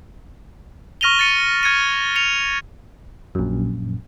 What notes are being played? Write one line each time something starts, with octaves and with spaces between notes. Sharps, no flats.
C#6 F6 A#6 D#7 F7 G7
A6 C#7 D#7
F6 G#6 C#7 D#7
C#7 F7
A#1 F#2